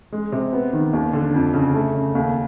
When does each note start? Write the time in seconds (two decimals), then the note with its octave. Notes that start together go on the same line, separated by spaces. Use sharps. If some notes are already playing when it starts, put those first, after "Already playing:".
0.12 G#3
0.32 C3
0.53 B3
0.73 D#3
0.93 D#2
1.13 D3
1.34 F2
1.54 C#3
1.74 A3
1.95 C#3
2.15 D#2